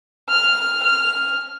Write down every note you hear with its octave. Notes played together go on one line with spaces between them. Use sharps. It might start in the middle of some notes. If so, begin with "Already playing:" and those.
F6
F6